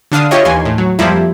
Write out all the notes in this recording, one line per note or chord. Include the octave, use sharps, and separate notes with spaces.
D3 D4 F5 D#6
E4 F4 G4 C#5 D#5
D#2 E3 G#5 C6
A2
F#3
F2 F3 G3 A#3 E4